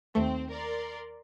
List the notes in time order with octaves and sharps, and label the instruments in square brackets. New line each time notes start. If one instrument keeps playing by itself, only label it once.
[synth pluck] D#2 A3 [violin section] C4
[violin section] A#4 D5 C6